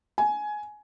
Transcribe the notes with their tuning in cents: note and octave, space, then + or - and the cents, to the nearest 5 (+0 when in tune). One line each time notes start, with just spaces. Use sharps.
G#5 +15